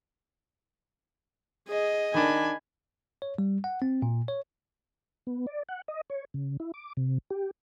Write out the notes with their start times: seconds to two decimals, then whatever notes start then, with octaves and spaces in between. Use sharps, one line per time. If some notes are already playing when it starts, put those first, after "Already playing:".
1.68 G#4 D#5
2.14 D#3 D4 G#5 B5
3.22 C#5
3.38 G3
3.64 F#5
3.82 C4
4.02 A#2
4.28 C#5
5.27 B3
5.47 D5
5.69 F#5
5.88 D#5
6.10 C#5
6.34 C#3
6.60 E4
6.74 D6
6.97 C3
7.30 G4